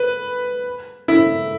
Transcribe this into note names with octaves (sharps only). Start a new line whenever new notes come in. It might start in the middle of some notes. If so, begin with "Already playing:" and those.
Already playing: B4
E4